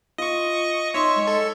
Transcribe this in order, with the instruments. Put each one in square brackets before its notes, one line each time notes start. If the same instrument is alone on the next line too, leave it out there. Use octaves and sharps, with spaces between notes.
[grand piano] F4 [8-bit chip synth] D#5 C#6
[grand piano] D#4 [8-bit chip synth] C#5 E5 C#6 [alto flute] C6
[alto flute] G#3
[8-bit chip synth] A4